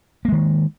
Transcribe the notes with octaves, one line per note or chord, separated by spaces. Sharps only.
D#3 G#3 A#3